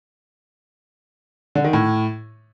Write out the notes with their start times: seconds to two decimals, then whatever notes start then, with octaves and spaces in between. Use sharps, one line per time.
1.55 D3
1.64 D#3
1.73 A2